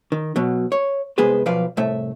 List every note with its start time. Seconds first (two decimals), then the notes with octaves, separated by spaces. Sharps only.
0.12 D#3
0.36 B2 F#3
0.72 C#5
1.18 C2 G#3 B3 G#4 B4 C5
1.46 B1 F3 B4 D5 F5
1.77 C2 A2 A3 E5